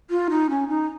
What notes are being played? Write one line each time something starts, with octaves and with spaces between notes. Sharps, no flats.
F4
D#4
C#4
D#4